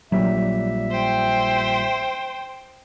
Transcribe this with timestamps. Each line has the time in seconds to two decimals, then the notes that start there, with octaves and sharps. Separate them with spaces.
0.12 A#1 A#2 F#3 G3 E5
0.91 C5 G5